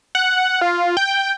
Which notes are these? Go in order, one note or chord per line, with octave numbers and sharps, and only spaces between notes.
F#5
F4
G5